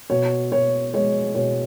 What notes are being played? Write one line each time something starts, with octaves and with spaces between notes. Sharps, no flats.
B2 C#5
B2 C#5
G#3 C#5
B2 C#5